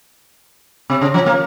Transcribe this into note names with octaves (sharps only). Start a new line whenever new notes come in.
C3
C#3
F3
A#3